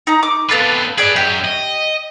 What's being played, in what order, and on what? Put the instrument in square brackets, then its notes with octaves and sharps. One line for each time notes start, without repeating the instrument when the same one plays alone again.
[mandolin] D#4 A#5
D6
[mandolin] B3 A4 F5 [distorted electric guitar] C4 B4
[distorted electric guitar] G4 B4 [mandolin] G#4 D5
[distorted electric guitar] F#2 [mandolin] G4
[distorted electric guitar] D#5